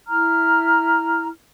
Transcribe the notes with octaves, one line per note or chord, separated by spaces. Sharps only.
E4 A#5 F6